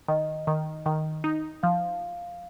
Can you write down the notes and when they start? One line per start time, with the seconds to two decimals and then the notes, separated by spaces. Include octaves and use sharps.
0.08 D#3 D#5
0.47 D#3
0.86 D#3
1.24 D#4
1.63 F3 F5